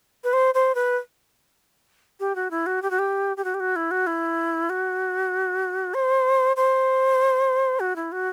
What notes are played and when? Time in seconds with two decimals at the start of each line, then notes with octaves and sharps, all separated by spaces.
0.24 B4
0.33 C5
0.54 C5
0.75 B4
2.20 G4
2.35 F#4
2.51 E4
2.66 F#4
2.82 G4
2.90 F#4
2.99 G4
3.37 G4
3.44 F#4
3.54 G4
3.60 F#4
3.76 E4
3.91 F#4
4.07 E4
4.70 F#4
5.94 C5
6.56 C5
7.80 F#4
7.96 E4
8.12 F#4